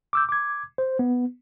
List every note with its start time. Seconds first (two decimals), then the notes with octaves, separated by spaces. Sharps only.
0.13 D6 E6 G6
0.29 D6 G#6
0.78 C5
0.99 B3